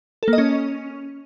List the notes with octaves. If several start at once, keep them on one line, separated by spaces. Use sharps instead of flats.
A4
A#3
D#5
C#4